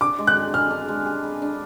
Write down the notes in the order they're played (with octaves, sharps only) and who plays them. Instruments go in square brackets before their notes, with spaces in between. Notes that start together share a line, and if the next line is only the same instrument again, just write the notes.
[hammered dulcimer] D4 [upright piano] D6
[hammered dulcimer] G#3
[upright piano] F#6
[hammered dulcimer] G#4
[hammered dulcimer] B4 [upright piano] F6
[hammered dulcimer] D4
G#3
G#4
B4
D4